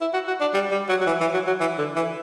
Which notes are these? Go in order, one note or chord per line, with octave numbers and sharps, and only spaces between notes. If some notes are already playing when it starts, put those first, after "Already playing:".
E4
F#4
F#4
D4
G3
G3
F#3
F#3
E3
E3
F#3
F#3
E3
D3
E3